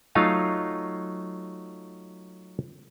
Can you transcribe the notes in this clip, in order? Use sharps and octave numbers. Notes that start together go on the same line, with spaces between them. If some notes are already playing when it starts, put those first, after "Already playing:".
F#3 A3 D#4 F4 F5